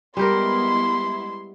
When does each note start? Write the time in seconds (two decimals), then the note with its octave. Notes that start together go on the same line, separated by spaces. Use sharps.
0.17 G3 G#3 B3 E4 G4 A#4 C6